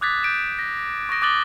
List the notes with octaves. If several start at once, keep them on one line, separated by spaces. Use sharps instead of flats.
D6 D#6 F#6 G#6 A6 B6
G6 D7 E7
A#6
C#6 D#6 A#6 D7
D6 D#6 F#6 A6 F#7 G7